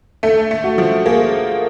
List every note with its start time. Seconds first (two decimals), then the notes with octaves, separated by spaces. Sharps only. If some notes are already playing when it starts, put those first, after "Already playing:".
0.23 A3 A4
0.51 A3
0.64 F#4
0.78 F3
1.05 A#3 G#4